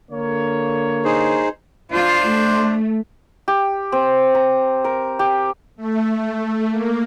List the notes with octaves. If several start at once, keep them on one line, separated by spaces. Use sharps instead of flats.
D3 A#3 C#5
D#4 G#4 C5
D4 F4 C5
A3
G4
C4
A#5
A#4
G4
A3
A#3